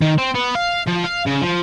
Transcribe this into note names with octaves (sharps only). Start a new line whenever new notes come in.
D#3
C4
B3
F5
F3
F5
C#3
F3